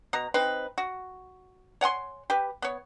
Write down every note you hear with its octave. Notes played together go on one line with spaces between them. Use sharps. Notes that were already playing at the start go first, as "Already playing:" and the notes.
B2 A#5
C4 D#4 B4
F#4
C#5 F#5 G#5 C6
G4 B4
B3 C#5